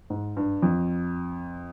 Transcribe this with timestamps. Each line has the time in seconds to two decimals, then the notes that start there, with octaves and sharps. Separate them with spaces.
0.10 G#2
0.37 G2
0.62 F2